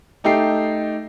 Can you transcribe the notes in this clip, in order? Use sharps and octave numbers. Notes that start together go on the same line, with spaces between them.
A3 D#4 G4 A4 G5 C7